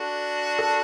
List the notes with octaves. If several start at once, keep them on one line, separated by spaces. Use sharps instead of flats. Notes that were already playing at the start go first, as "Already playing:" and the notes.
Already playing: D4 F#4 A4
A4